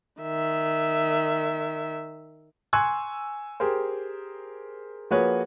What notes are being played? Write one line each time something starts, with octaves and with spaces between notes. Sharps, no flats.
D#3 E5
G#5 C6 C#6 E6 F#6 G#6
G4 G#4 A#4 C5
F3 A#3 F#4 G#4 B4 C#5